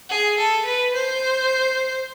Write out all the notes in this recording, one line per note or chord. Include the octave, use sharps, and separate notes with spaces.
G#4
A4
B4
C5